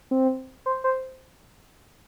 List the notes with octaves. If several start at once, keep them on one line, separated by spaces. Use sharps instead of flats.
C4
C5
C5